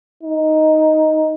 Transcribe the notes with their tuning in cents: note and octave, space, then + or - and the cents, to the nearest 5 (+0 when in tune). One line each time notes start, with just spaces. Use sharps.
D#4 +5